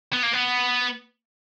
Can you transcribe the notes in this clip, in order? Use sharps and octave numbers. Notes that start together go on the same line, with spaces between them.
B3
A#3
B3